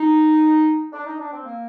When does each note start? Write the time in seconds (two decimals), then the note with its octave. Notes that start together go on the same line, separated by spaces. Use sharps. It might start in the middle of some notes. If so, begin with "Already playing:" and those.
Already playing: D#4
0.92 D4
1.05 D#4
1.18 D4
1.32 C4
1.45 A#3